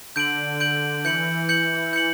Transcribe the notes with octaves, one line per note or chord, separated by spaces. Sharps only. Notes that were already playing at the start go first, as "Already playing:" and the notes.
D3 G6 D7 F#7
G6 D7 F#7
E3 G6 C#7 F#7
G6 C#7 F#7
G6 C#7 F#7